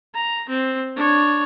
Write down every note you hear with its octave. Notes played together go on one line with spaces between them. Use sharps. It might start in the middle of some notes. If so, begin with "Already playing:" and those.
A#5
C4
D4 C#5